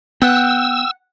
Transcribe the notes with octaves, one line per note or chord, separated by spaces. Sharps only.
B3 F#5 G5 E6